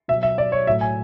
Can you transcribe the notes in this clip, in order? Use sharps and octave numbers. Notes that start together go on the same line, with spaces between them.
B2 E5
F#3
E5
D5
C#5
A2 F#3 E5
G#5